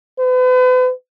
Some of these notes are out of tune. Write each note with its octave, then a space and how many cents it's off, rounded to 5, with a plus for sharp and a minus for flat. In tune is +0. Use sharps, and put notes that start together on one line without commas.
B4 +40